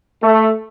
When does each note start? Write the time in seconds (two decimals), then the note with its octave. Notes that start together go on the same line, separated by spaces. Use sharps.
0.22 A3